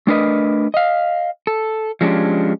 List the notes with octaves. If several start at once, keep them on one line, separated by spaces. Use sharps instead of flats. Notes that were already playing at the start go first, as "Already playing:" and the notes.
A3 D4 A#4 B4 D#5
D#5 F5
A4
F3 G#3 C#4 D4 G4